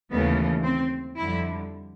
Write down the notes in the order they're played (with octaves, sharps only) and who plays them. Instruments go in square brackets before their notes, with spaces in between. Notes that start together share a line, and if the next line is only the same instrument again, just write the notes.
[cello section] D#2 C#3 E3 A3 B3
C4
F2 D3 G3 E4